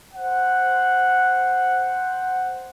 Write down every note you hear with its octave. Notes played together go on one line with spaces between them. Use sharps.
C5 F#5